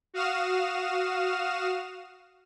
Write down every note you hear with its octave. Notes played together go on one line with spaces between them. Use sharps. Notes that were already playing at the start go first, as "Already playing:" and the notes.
F#4 F5 D#6 F6 E7